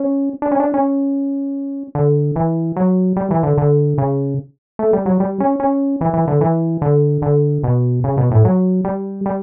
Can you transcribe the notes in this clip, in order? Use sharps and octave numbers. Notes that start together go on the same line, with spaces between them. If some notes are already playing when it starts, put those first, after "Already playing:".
Already playing: C#4
D4
C#4
D4
C#4
D3
E3
F#3
G3
E3
D3
D3
C#3
A3
G3
F#3
G3
C#4
C#4
E3
E3
D3
E3
D3
D3
B2
C#3
B2
A2
F#3
G3
G3